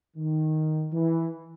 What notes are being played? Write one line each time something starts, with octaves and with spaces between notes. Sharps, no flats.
D#3
E3